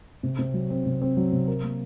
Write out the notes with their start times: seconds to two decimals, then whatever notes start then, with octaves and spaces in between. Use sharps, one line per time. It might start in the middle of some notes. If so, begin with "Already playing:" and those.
0.23 C3
0.39 C3
0.54 F#3
0.70 C4
0.86 C3
1.02 C4
1.17 F#3
1.32 C3
1.48 A#4
1.63 A#3